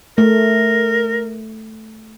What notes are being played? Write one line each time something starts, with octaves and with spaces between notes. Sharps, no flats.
A3 A#4